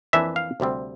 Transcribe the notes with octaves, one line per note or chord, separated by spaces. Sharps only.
F2 E3 A#3 D4 E5
F5
D2 C3 G3 C4